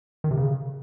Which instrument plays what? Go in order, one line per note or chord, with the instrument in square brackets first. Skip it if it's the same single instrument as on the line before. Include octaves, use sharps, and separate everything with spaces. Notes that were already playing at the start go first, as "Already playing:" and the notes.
[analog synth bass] D#3
C3
C#3